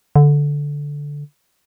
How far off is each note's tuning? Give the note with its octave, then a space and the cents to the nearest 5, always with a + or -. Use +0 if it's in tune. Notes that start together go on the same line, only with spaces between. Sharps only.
D3 -10